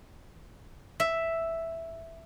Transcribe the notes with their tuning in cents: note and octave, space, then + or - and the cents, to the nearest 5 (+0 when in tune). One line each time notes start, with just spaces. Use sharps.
E5 +0